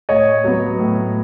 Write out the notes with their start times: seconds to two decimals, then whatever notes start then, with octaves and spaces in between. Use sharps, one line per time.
0.09 A2 C#5 D#5
0.44 F#3 B3
0.79 A2